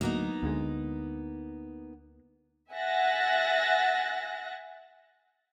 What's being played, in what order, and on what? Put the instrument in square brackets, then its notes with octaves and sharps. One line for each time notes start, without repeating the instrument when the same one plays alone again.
[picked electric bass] D2 F#3 [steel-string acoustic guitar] A#3 B3 D#4
[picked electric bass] D2 D3 G#3
[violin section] E5 F#5 G#5 F#6 A6 A#6